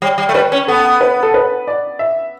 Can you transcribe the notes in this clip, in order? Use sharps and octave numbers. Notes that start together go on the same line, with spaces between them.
G3 C#5
G3
A3
G3 B4
C#4
B3 A4
B4
A4
B4
D5
E5